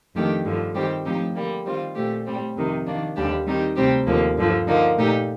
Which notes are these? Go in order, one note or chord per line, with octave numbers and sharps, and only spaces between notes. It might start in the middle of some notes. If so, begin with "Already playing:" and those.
F2 D#3 A3 D4 G4
G2 D3 F3
D#3 G3 C4 G4
A2 F3 C4 D#4 G4
D3 G3 A#3
D#3 G3 C4 F4
A#2 A3 C4 G4
A2 G3 C4
F2 C3 D#3
D#3 A#3 D4
D#2 D3 G3 D4 G4
D#3 G3 C4 D#4 G4
D2 C3 G3 C4 G4
D#2 D3 F3 A#3
G2 D3 F3
D3 F3 A#3 D#4
A#2 A3 D#4 G4